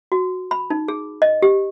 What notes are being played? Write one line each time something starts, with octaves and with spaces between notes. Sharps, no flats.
F#4
B5
D#4
G#4
D#5
G4